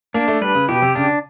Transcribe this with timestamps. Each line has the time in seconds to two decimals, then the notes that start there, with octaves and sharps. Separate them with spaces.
0.14 A#3 D4
0.28 A3
0.41 G3 B4
0.55 C#3
0.69 B2 G4
0.82 C3
0.95 C#3 D4